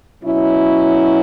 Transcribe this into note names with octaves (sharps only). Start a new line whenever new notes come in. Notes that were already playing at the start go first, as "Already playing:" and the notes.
B2 F#3 C#4 E4